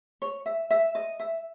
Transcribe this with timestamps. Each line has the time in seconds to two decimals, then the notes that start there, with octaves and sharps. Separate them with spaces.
0.22 C#5
0.46 E5
0.70 E5
0.95 D#5
1.20 E5